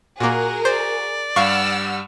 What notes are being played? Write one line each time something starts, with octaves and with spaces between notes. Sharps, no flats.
A#2 A#3 F#4 G#4 A#4 F#5
C5 D5
G2 G3 F5 F#5 C#6 E6 F6